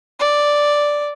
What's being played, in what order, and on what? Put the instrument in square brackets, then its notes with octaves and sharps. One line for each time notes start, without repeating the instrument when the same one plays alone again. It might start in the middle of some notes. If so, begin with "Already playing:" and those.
[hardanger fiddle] D5